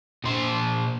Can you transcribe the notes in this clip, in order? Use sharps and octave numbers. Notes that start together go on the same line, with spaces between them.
A#2 C5